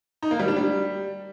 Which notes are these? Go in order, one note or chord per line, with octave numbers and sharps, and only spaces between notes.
D#4
A#3
G3
D4
G3